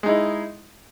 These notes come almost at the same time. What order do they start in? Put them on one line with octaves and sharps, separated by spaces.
G#3 D#4 E4